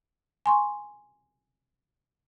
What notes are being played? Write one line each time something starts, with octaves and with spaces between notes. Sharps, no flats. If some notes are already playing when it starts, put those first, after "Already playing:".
G#5 C6 C#6